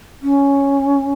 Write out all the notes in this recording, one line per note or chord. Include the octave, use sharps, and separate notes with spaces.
C#4